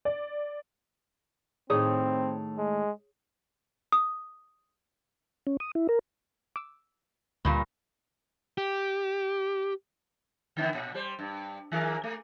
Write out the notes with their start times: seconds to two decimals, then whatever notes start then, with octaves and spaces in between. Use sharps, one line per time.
0.05 D5
1.70 A2 D#3 C4 G#4 C#5 D#5 D#6
2.58 G#3
3.92 D#6
5.47 C#4
5.60 D#6
5.75 E4
5.89 A#4
6.56 D6 E6
7.45 D2 G2 A#2 G3
8.58 G4
10.57 D3 D#3 B3
10.74 A#2
10.95 G3 C5
11.19 G2
11.72 D#3 G#4 A#4
12.04 A3